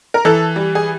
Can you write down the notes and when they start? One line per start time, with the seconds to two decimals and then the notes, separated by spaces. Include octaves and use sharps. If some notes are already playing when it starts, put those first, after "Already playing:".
0.14 A#4
0.25 E3 A4
0.56 G3
0.75 G#4